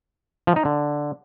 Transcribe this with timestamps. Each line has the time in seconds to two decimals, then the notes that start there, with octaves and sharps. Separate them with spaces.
0.47 F3
0.56 D#4
0.65 D3